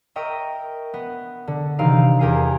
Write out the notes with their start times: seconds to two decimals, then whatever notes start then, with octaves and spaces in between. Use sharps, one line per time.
0.16 A#4 D#5 E5 G5 C#6
0.94 B3
1.47 D3
1.79 C3 D#3 E3 D#4 F5 D7
2.19 E2 G4 A#4 G#5 C7